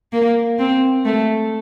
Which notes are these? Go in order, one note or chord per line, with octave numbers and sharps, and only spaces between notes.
A#3
C4
A3